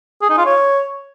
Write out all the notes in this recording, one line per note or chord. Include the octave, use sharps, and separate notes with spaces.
G#4
D#4
F4
C#5